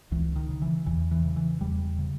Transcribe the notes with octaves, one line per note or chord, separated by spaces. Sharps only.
C#2 E3
D#3
C#3
E3
E2 E3
E3
C#3
E3
E2 G3
C#3